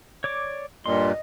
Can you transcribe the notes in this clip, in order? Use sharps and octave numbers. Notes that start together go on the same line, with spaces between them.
C#5 D5 D6
G2 A#2 D#5 C6